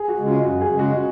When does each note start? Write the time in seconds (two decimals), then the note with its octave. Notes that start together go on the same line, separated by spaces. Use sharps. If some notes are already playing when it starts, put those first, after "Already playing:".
Already playing: G#4
0.08 F#4
0.18 C#3 G#3
0.26 F4
0.43 F#2 F#4
0.61 G#4
0.70 C#3 G#3
0.79 F#4